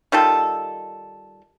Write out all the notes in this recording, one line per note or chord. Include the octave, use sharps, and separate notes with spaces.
D#3 G3 F4 A4